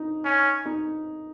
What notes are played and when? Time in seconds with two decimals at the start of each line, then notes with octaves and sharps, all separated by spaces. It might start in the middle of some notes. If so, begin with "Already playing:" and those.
Already playing: D#4
0.24 C#4
0.66 D#4